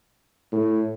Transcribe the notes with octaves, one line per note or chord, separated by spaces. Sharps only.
A2